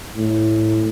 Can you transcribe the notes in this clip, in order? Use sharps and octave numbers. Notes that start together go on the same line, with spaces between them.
A2